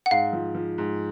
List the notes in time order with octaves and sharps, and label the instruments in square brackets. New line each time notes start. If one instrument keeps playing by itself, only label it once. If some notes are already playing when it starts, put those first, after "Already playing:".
[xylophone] F#5
[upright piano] G#2 [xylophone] F5
[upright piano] F3
F3
G#2